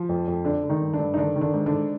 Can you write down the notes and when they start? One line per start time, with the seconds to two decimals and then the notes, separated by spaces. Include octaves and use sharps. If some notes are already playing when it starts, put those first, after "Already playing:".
Already playing: F3 F4
0.09 F2
0.27 F2
0.45 D3 D4
0.64 D3
0.69 D#3 D#4
0.81 G2
0.93 D3 D4
0.99 G2
1.14 D#4
1.17 D3 D#3 D4
1.36 D#3
1.41 D3 D4
1.54 G#2
1.66 D3 D4
1.72 G#2